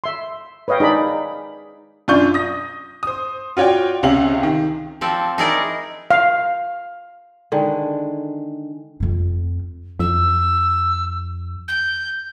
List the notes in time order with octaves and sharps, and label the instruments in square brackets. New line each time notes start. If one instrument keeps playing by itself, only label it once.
[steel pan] E5 C6
B4 C#5 D#5 F5 G5
D#4 G#4 D5 B5
[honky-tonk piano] F#2 D4 F4 D5 C#6 G6
D#6 A#6
C5 D#6
F4 F#4 C#5 D5 G5
C#2 C3 C4 C#4 F5 F#7
D#3
[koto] F3 C4 A4 D5
D#4 E4 G#4 A#4 D5 D#5
[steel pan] F5
[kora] D3 D#3 G#3
[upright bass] F2 C4
[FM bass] F2 [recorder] E6
[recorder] G6